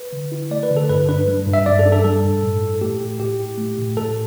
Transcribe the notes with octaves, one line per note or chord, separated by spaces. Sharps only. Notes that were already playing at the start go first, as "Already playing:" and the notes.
Already playing: B4
D3
E4
A3 D5
B4
D3
A4
G2 B4
D4 B4
G3
G2
E5
G2 D5
A4
D4
A4
G3 A4
G2
A2
E4
A3 G4
A2
A2 G4
E4
A3
A2
A2 A4